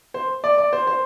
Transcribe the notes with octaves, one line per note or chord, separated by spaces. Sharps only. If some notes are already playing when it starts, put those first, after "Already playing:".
C5
D5
D5
C5
C5